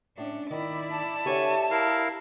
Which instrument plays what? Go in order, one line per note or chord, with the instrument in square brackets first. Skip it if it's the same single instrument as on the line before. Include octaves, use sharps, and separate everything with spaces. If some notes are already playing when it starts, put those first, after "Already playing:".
[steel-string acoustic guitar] A2 [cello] C#4 D4
[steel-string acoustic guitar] D#3 [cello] E4 D5
[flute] A5
[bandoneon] D3 G#5 C#6 [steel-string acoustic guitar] G4 C#5 E5
[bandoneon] E4 A#4 F5